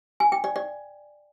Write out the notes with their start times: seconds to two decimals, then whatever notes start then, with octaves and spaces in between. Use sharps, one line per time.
0.20 G#5
0.32 G5
0.44 D5
0.56 D5